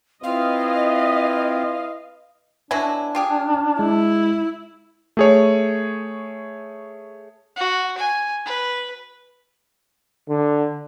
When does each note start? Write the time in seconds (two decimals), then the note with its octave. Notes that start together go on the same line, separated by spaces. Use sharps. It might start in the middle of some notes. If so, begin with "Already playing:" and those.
0.23 C4 E4 F4 B4 D#5 F5
2.71 B2 F#3 D4 E4 G#5
3.15 F4 G4 G#4
3.79 G#3 E4
5.17 A3 G#4 C#5
7.57 F#4
7.98 G#5
8.46 B4
10.29 D3